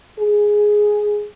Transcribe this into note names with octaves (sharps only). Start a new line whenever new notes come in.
G#4